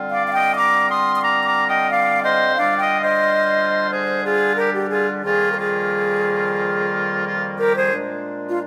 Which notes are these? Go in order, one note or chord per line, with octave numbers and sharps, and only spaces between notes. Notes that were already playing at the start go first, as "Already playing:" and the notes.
Already playing: D3 G3 C4 F4
D5 F5
F5
D#5 G5
A#5 D6
C6 D#6
D#6
A#5 D6
A#5 D6
D#5 G5
D5 F5
C5 D#5
D3 G3 D4 F4 D5 F5
D#5 G5
C5 D#5
G#4 C5
F4 G#4
G4 A#4
G4
F4 G#4
F2 D#3 G3 A#3 F4 G#4
A#4
F4 G#4
F4
G4 A#4
G#4 C5
A#2 G#3 D4
F4